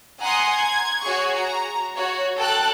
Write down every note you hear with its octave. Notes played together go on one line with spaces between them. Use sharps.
F#5 G#5 A#5 C6 D#6
G#6
F#4 G#4 C#5 C#6
A#5
F#4 C#5
A4 G5 A5 F#6